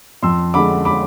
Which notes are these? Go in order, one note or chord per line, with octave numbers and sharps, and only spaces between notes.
F2 C6 E6
D3 G#3 B5 D6
B5 D6